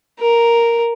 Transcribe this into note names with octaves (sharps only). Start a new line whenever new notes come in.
A#4